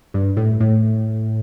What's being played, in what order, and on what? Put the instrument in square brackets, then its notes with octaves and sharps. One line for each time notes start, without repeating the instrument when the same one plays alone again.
[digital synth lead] G2
A2
A2